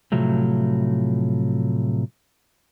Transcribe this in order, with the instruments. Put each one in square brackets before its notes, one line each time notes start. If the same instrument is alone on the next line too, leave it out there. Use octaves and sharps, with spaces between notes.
[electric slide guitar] A2 C3 F3 F#3 A3